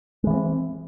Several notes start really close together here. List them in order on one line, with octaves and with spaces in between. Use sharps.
G#3 E3 B3 C4